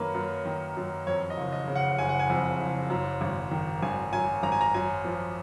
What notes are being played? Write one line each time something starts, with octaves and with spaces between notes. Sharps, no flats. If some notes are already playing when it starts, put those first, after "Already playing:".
Already playing: F#2 D#3 A#3 B4 C#5
F#2
D#3
F#2
F2 C#5
D#5
F#1
D#5
C#3
F#5
F#1 G#5
F#5
G#5
F2
F#1
F#2
G#1
D#3
G#1 G#5
F#2 G#5
G#1 A#5
G#5
A#5
F#2 G#5
F3